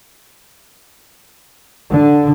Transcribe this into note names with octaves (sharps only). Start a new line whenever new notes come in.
D3